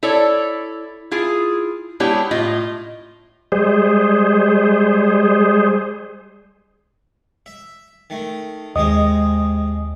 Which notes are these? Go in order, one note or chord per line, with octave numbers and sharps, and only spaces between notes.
E4 A4 C#5 D5
E4 F4 G#4
G#3 B3 D4 E4 G4 C#5
A2 F4 D#5
G3 G#3 G#4 C5
E5
D#3 A3
D#2 C3 G#3 C5 D#5 D#6